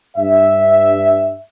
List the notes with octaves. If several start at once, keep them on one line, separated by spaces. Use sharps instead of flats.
G2 E5